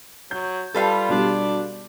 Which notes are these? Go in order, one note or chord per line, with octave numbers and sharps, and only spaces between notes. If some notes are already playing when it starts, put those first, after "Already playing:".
F#3 G6
G3 F4 A4 B4 F5
B2 G3 D4